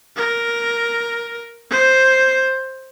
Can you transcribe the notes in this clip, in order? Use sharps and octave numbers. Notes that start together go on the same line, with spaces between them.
A#4
C5